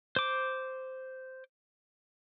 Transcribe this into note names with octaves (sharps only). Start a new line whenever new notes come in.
C5 D6